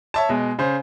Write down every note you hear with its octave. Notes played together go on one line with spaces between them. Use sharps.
C#5 E5 A5
B2 G#3
C#3 C5